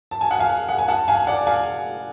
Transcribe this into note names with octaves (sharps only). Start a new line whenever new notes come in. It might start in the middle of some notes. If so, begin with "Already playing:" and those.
A5
G#5
F#5
F5 G#5
F#5
G#5
F#5 A5
F5 G#5
D5 F#5
F5 G#5